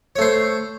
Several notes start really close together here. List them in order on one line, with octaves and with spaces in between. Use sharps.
C#5 A3 C5